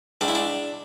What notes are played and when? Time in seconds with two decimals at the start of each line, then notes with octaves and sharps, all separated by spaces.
0.21 C#2 D4
0.28 E4
0.35 D4